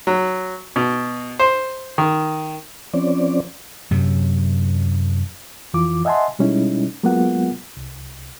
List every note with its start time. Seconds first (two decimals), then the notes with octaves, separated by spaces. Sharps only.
0.07 F#3
0.76 B2
1.39 C5
1.98 D#3
2.94 F3 C4 C#4 D5
3.91 F#2 C3 F#3
5.74 F2 E3 F4 D6
6.05 D#5 E5 F#5 G#5 A5 C6
6.39 B2 G3 G#3 C#4 D#4 E4
7.03 F#3 G#3 A#3 B3 F4 F#5
7.77 C2